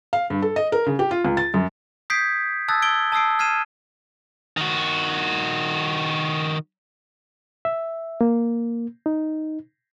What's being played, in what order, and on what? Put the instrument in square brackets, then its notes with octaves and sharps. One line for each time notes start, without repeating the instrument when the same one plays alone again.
[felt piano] F5
G2
A4
D#5
A#4
C#3
G4
F4
C#2
A6
F#2
[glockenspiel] D#6 G6 G#6 B6 C7 D7
A5 D#6 E6 F#6 G#6 A6
E6 G#6 D7 G7
A5 D#6 E6 C7 D7
F6 G#6 C7 D#7 E7
[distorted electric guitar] D#3 F#4
[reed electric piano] E5
A#3
D#4